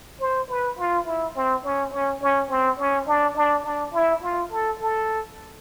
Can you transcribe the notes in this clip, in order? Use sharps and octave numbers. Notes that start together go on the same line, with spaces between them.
C5
B4
F4
E4
C4
C#4
C#4
C#4
C4
C#4
D4
D4
D4
E4
F4
A4
A4